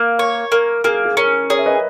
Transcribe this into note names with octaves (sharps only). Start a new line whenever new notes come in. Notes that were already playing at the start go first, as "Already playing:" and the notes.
Already playing: A#3
A#4 C#5
A#3 A#4
A#3 G#4
G#4
C#4 A#4
G#4 A#4 C#5
E5
B4 D#5